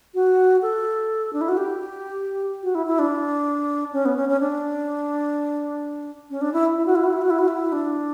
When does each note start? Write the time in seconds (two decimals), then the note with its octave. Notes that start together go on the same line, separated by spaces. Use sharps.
0.14 F#4
0.62 A4
1.33 D4
1.41 E4
1.49 F#4
1.57 G4
2.63 F#4
2.75 E4
2.87 E4
2.99 D4
3.93 C#4
4.05 B3
4.16 C#4
4.29 C#4
4.40 D4
6.30 C#4
6.41 D4
6.53 E4
6.77 E4
6.86 F#4
6.95 E4
7.04 F#4
7.13 E4
7.22 F#4
7.30 E4
7.39 F#4
7.48 E4
7.72 D4